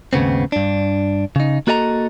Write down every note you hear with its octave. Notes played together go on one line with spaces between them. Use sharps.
D#2 G#2 C#3 B3 C4
G2 D4
C#3 D#4
A#3 F#4 A4 D#5 F5 A#5